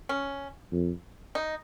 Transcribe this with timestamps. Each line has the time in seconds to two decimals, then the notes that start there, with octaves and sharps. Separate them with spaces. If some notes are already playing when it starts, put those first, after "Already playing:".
0.09 C#4
0.72 F2
1.35 D#4